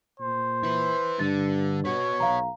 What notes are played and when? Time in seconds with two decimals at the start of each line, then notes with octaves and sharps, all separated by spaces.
0.20 A#2 C5
0.63 E4 B4
1.19 G2 D3 A6
1.85 F#4 B4 C#5
2.20 B1 F5 A#5